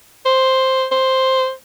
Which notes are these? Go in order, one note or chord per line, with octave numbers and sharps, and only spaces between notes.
C5
C5